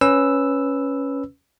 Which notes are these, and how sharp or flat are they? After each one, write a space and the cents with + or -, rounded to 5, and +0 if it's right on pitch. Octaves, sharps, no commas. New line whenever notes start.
C#4 +0 B4 +0 E6 +0